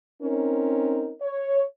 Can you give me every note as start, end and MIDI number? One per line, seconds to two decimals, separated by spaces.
0.23 1.12 60
0.23 1.12 61
0.23 1.12 63
0.23 1.12 70
1.22 1.62 73